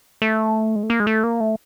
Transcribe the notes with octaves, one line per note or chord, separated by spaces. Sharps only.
A3
G#3
A3
A#3
G#3
A3
A#3
A3